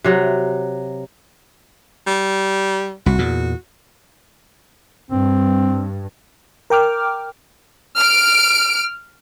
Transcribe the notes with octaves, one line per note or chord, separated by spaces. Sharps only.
C3 F#3
G3
C2 F#4
E2 A#2
G2 C4
A#4 G5 D6 F6
F6 D7